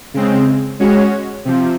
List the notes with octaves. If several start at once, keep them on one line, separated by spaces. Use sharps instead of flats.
C#3 G#3 C4
G#3 C#4 F#4 C#5
C3 F3